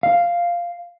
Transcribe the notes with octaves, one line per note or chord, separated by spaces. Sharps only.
F5